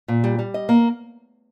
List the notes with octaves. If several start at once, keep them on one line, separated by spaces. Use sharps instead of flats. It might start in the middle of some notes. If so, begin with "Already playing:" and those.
A#2
G3
G3
D#5
A#3